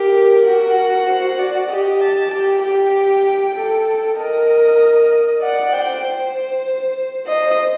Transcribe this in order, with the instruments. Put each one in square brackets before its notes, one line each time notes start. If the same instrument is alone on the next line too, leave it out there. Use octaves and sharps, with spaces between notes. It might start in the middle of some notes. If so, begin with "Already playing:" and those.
Already playing: [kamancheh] G4 [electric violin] A#4
[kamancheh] F#4
[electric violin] C5
D5
[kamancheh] G4 [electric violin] D#5
[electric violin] A5
[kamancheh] G4 [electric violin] G5
[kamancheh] G4
A4
[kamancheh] A#4 [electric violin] D#5
[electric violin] D5 [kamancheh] F#5
[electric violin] C5 [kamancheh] G5
[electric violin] C5 [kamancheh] D#5